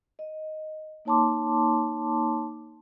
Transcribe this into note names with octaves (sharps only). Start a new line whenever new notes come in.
D#5
A#3 D#4 C#5 A5 C6 D6